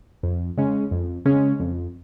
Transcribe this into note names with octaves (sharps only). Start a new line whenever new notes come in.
F2
C#3 G#3 C#4
F2
C#3 G#3 C#4
F2